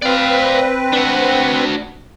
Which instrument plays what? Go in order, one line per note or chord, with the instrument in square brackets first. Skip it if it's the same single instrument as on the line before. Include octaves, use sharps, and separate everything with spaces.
[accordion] C4 B4 [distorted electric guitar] D5 F5
[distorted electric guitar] D4 F#4